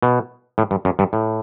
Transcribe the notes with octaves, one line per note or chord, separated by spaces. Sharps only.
B2
A2
G2
F#2
G2
A2